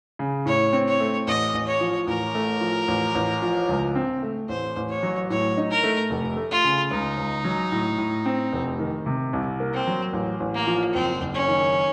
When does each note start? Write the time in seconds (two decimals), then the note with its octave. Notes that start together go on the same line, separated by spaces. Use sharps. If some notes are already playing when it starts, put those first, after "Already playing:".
0.19 C#3
0.46 A2 C#5
0.73 C4
0.87 C#5
1.00 A3
1.27 A1 D#5
1.53 A1
1.67 C#5
1.81 F3
2.07 A1 A#4
2.35 A3
2.61 F3
2.88 A1
3.15 A1
3.42 F3
3.69 C#2
3.95 C4
4.23 A3
4.49 A1 C5
4.76 A1
4.89 C#5
5.03 F#3
5.30 A2 C#5
5.57 D#4
5.70 A#4
5.84 A3
6.10 F1
6.37 A3
6.51 F4
6.64 C#3
6.91 C#2 D#4
7.17 C#2
7.45 F#3
7.72 A2
7.98 A2
8.26 C4
8.52 F1
8.79 D#3
9.06 C3
9.33 C2
9.60 A#3
9.74 C4
9.87 F#3
10.13 A1
10.40 A1
10.54 A#3
10.67 F3
10.93 F#1 C4
11.21 F#1
11.34 C#4
11.48 D#3